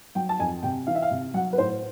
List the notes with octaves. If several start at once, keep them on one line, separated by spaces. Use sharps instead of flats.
F#3 G5
A5
F2 G#5
C3 G5
E3 F5
E5
F5
C3
F#3 F#5
B4
A2 C5